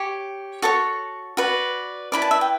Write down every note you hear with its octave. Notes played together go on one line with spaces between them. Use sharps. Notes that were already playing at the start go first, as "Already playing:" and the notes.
Already playing: G4 C#5 D6
F#4 A4 C#5 C#6
F#4 B4 D5
E4 B4 D5 B5
A5
E5
G5